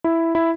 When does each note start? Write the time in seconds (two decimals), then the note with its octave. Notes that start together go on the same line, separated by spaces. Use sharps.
0.04 E4
0.35 E4